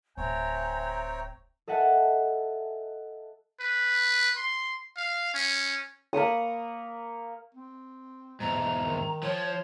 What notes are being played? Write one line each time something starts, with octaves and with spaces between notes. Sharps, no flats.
D1 C4 C#5 E5 G#5 A#5 G6
A4 D#5 E5 F#5 G#5 A5
B4
C6
F5
C#4
A#3 B5 C#6 D#6
C4
E2 G#2 A#5
D#3
F3 C#5